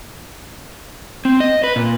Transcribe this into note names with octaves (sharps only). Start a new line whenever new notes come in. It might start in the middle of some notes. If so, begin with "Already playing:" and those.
C4
D#5
B4
A#2